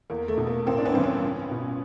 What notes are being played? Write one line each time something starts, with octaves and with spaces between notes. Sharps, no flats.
E2 A#3
A3
B2
A#3
A1 A#3 C4
D4
B3 C#4
G2 E3 C4
B3 C#4
C#2
B2